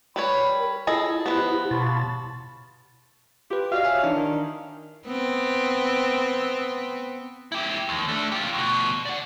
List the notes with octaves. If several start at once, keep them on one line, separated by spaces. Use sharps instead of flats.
G3 B4 C#5 B5
A#4
E4 F4 G#4 A4 D#5 A5
F3 F#3 B3 E4 G4 B4
B2 F4 C#5 A5 B5 A6
F4 G4 B4
F#4 D5 D#5 F5
C#5 E5 G#5
E3 D4 D#4
D#3
B3 C4
E4 G4
D#2
A3 D4
F4 G4
D2 B2
D5 F#5